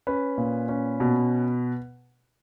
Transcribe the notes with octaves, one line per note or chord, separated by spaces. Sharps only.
C#4 B4
A#2
C#4
B2